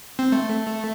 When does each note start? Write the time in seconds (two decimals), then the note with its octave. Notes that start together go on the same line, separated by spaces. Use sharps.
0.19 C4
0.32 A3